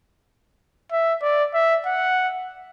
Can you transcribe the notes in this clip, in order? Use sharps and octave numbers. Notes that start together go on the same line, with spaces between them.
E5
D5
E5
F#5